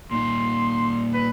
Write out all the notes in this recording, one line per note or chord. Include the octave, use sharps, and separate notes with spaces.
A#2 D#4 C6
B4